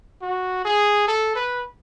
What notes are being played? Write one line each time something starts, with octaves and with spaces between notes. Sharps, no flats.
F#4
G#4
A4
B4